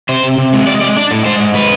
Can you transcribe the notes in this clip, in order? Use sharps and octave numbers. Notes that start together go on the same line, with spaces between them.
C3 C5
C3
C3
G#3
G#3 D5
G#3 D5
D4 D5
A2
G#3 C5
G#2
G#3 B4